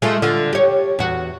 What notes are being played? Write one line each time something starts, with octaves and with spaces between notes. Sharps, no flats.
G#3 A3 F4
D3 F4
G4 C#5
E2 F#4